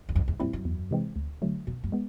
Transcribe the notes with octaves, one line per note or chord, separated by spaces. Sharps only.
E2
C2 F2
E2
F2 A#2 G3 C4 E4
F#2
E2
C3 E3 G#3 C4
D2
D3 F#3 A3
F2 B2
F#2
G#3 B3